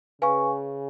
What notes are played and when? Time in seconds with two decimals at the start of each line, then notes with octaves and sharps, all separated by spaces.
0.22 C#3 B4 F5 G#5 C#6